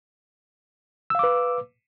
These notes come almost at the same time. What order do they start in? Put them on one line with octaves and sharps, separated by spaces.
E6 F5 D6 B4